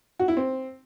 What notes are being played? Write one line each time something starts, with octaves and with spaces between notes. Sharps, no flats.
F#4
E4
C4